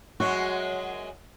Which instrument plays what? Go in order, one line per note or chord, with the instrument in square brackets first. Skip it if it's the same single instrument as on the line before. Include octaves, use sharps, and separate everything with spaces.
[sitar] F#2 F#3 G#3 [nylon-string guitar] F#4